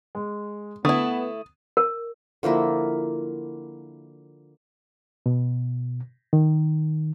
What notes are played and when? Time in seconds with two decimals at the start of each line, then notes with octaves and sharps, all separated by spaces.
0.15 G#3
0.85 D3 A3 B3 E4 D#6
1.77 A#4
2.43 D3 F3 A#3 E4
5.26 B2
6.33 D#3